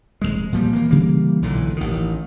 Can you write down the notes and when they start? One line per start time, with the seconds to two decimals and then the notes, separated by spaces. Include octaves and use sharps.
0.22 F1 D#2 G#3
0.53 A#2 F3 G3
0.73 E3 A#3
0.91 C#3 E3 G3 A#3
1.42 B1 A#2 D3 E3
1.76 A1 D#3